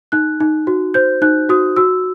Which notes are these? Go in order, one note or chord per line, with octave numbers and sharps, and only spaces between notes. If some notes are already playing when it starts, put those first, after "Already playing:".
D#4 F#6
D#4
F#4
C5 G6
D#4 F#6
F#4 D#6
F#4 E6